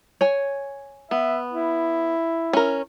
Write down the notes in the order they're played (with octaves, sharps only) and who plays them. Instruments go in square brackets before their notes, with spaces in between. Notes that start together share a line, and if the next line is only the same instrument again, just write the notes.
[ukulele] C#5 G#5
[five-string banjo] B3 [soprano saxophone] E5
[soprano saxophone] E4
[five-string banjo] C#4 A#4